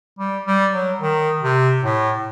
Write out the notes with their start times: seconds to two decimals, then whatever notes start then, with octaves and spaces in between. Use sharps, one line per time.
0.19 G3
0.46 G3
0.73 F#3
1.01 D#3
1.42 C3
1.83 A2